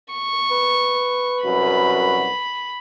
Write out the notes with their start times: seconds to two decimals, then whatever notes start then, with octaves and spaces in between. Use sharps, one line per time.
0.14 C#6
0.51 B4
1.44 C2 F#2 F#4 B5